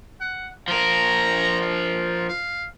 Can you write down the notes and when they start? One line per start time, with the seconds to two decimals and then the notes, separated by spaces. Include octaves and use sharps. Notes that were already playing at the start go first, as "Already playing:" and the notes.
0.21 F#5
0.68 F3 A#4 A#5
1.61 F4
2.29 F5